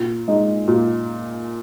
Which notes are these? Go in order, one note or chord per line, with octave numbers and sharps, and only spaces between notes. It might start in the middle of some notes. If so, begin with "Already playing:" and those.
Already playing: A#2
G#3 D#4
A#2